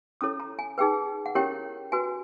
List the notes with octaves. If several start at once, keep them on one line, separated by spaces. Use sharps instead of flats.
C#4 E4 A4 C#5 D#6
A#5
G#5
D#4 G#4 B4 G5
F#5
C#4 E4 G4 A#4 C#5 G5
F#4 B4 G#5